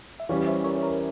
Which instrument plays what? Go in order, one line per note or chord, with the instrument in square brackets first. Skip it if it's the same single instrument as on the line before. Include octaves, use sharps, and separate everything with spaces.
[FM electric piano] E5
[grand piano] E3 G3 C#4 [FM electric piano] C#5 F5
[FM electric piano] C5 E5
A#4 C#5
A#4